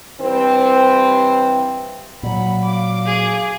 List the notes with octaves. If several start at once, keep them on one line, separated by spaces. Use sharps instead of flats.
G2 E3 G3 C4
A#2 F#3 F#5 B5
F5 D6
G#4